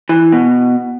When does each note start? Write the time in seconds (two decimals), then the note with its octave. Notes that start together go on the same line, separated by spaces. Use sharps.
0.09 E3
0.32 B2